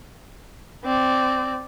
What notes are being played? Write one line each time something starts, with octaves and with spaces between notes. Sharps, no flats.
C4 D5